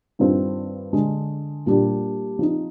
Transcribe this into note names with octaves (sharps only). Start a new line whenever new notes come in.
G2 D#3 G3 C4 F4
D3 G#3 D4
A#2 G3 D4 G4
F3 C4 D#4